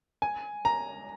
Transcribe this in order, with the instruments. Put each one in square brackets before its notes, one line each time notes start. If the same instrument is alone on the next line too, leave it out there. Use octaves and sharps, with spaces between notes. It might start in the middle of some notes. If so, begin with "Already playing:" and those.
[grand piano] G#5
A#5